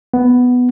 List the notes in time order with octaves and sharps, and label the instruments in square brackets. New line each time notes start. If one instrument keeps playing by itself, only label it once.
[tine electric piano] B3